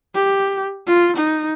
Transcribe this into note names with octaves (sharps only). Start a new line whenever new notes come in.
G4
F4
D#4